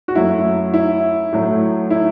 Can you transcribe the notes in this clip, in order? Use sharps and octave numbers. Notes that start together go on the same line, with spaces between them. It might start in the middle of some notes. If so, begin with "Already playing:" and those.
F#4
F#2 F#3 A3 E4
E4
A2 F#3 A3
E4